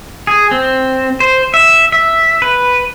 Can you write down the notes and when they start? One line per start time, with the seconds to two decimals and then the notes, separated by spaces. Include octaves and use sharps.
0.27 G#4
0.51 C4
1.20 C5
1.54 E5
1.92 E5
2.42 B4